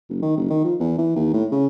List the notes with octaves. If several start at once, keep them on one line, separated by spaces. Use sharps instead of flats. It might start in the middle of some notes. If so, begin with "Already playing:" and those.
F#1
D#3
F#1
D#3
F3
E2
E3
D#2
A2
C#3